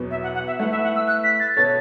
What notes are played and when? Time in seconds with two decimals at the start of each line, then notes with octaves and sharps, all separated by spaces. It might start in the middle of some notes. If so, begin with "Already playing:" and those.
Already playing: E2 B2 F#3 B3
0.11 E5
0.23 F#5
0.34 F#5
0.47 E5
0.59 A3 E4 B4 F#5
0.71 E5
0.83 F#5
0.96 E6
1.08 F#6
1.24 B6
1.40 A6
1.57 B2 B3 A4 C#5 A6